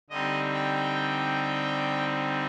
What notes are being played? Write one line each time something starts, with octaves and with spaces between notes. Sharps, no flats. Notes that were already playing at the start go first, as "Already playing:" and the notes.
D3 G3 C4 D#4 D#5
G5